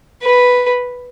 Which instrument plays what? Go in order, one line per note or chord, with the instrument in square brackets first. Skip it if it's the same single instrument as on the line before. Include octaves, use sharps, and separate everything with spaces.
[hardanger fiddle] B4